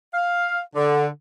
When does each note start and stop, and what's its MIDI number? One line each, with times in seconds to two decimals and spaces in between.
0.14 0.58 77
0.76 1.06 50